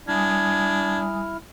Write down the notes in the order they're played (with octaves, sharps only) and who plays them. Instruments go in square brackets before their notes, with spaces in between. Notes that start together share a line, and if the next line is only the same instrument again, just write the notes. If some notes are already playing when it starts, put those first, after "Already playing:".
[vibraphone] G3 G#5 D#6 [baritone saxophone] D4 [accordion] E4 F6 [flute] G#6